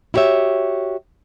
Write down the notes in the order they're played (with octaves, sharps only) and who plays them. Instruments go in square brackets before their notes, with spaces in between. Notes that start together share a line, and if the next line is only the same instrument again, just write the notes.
[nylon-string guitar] E4 F#4 G4 C#5 E5